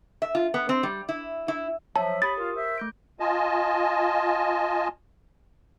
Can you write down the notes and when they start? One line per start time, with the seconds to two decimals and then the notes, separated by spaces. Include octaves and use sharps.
0.22 E5
0.35 F4
0.54 B3
0.69 C4
0.83 G3
1.09 E4
1.48 E4
1.96 F3 F#3 C#5 E5 A5
2.22 G4 B5 D#6 A6
2.37 F4 A#4
2.56 C5 E5
2.78 A3 G6 D7
3.20 F4 D#5 G#5 A5